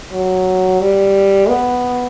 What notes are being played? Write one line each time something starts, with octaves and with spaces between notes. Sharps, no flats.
F#3
G3
B3